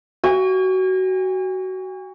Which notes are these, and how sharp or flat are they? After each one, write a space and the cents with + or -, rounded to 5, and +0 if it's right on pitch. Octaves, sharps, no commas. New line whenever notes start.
F#4 +20 G#5 -40